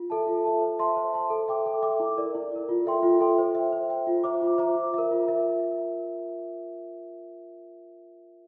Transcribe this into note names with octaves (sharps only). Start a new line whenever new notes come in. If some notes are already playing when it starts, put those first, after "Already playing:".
Already playing: F4
A4 E5 A5
F4
A4 E5 A5
C5
E5 A5 C6
C5
E5 A5 C6
A4
E5 G5 D6
A4
E5 G5 D6
E4
A#4 D5
E4
A#4 D5
F4
A4 E5 G5 C6
F4
A4 E5 G5 C6
C5
E5 G5
C5
E5 G5
F4
C5 E5 A#5 D6
F4
C5 E5 A#5 D6
F4
A#4 E5
F4
A#4 E5